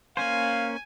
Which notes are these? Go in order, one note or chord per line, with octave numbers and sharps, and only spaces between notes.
A#3 C#4 C5 F5 G#5